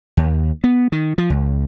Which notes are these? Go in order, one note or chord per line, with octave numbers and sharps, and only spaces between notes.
D#2
B3
D#3
F3
C#2